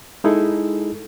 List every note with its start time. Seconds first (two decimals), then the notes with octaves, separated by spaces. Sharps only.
0.24 G#3 D#4 E4 G#4 A4